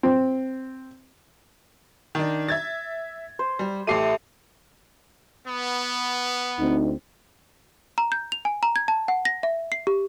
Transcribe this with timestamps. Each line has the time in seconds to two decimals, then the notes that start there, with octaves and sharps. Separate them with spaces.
0.03 C4
2.15 D#3 D4
2.49 E5 G#6 A6
3.39 C5
3.59 G3
3.87 A1 A3 G4 E5 C7 D#7
5.47 B3
6.59 D2 C4 D#4
7.98 A#5
8.12 G6
8.32 F7
8.45 G#5
8.63 A#5
8.76 G#6
8.88 A5
9.08 F#5
9.25 A#6
9.43 E5
9.72 C7
9.87 G4